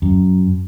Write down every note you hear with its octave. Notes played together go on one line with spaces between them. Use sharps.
F#2